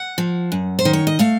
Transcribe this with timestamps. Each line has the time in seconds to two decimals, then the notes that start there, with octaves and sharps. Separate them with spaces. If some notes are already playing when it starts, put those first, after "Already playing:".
Already playing: F#5
0.18 F3
0.52 F#2
0.79 C5
0.85 D#3
0.93 C#5
1.07 D#5
1.19 A3 F5